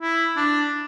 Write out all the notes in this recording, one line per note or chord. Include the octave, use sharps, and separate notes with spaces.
E4
D4